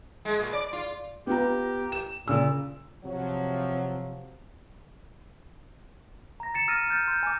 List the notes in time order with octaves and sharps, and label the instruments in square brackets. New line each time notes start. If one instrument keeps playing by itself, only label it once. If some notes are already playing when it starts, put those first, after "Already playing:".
[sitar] G#3
A#2
D5
F4
[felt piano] B3 F4 A#5 [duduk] G4
[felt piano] E7
[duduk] A#2 [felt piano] C#3 E6
[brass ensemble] C3 F3 F#3
[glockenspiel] A#5 A#6
A6 C#7 E7
E6 F6 A6 A#6 C#7 D#7
F6 G6 A6 C#7
C6 G6
G#5 D6